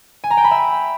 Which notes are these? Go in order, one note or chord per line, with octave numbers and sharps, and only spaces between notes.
G#5
A#5
G5
B5
E5